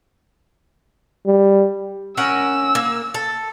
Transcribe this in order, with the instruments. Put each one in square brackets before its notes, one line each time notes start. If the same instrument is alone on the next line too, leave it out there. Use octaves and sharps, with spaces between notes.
[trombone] G3
[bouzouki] C#4 A#4 F#5 [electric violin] E6
[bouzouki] A#3
A4